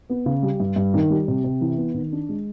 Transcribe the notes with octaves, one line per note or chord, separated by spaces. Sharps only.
B3
C#3
G3
G2
G2
D#3
G3
C3
C3
E3
B3
D#3
D4
G#3